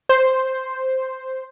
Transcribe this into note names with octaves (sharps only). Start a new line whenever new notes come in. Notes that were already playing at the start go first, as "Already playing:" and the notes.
C5